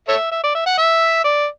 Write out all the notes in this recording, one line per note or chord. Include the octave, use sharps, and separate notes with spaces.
A4 C#5 E5
E5
D5
E5
F#5
E5
D5